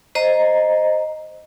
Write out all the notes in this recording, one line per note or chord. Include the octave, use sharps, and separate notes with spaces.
C5 D#5 A#5